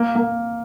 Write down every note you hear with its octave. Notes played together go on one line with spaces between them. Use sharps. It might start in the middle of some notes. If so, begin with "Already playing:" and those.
Already playing: A#3
A#3